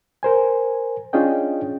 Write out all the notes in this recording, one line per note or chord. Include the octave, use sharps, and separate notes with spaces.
A#4 C5 G#5
C#4 D4 F4 G#4 D#5 G5